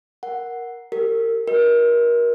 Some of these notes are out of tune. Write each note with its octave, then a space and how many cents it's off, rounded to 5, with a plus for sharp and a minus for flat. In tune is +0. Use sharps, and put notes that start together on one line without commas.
A#4 +10 F#5 +0
G4 +0 A#4 -30
F#4 +0 A#4 +30 D#5 +25